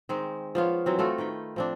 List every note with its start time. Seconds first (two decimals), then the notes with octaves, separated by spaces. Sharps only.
0.09 D#3 G#3 C4
0.55 F3 B3 F4 C#5
0.86 E3 F#3 C4
0.99 A3 F4 F#4 A4
1.18 D#3 B4 G5
1.56 F3 C4 D4